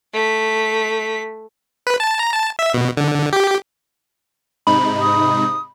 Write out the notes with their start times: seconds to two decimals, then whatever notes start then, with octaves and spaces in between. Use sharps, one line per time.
0.13 A3 B6
1.87 B4
2.00 A5
2.19 A#5
2.32 A5
2.59 E5
2.74 B2
2.97 D3
3.33 G4
4.67 G#2 C3 D#4 B5
5.01 D#6